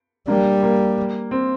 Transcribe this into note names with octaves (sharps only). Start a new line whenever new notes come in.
G3 A#3 D4
A#3
C4